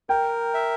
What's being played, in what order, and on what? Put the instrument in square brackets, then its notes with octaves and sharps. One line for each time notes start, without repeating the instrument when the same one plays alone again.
[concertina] A#4 [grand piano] G5
[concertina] E5